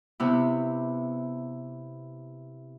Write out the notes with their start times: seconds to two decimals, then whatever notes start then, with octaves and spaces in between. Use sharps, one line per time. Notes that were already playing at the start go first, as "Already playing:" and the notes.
0.20 C3 B3 E4